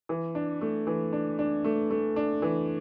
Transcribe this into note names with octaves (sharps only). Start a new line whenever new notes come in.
E3
D4
A3
E3
D4
D4
A3
A3
D4
E3